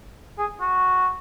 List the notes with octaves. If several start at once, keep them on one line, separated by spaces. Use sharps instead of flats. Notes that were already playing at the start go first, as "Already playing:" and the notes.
G#4
F#4